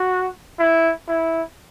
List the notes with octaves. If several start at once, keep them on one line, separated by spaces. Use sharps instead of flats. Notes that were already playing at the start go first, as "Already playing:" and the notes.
Already playing: F#4
E4
E4